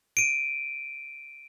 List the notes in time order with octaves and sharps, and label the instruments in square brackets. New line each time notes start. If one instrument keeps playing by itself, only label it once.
[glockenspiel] D7 D#7